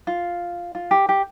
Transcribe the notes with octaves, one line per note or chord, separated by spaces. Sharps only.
F4
F4
G4
G4